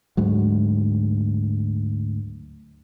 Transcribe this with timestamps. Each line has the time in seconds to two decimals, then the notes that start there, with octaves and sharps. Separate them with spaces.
0.17 D2 G#2 F#3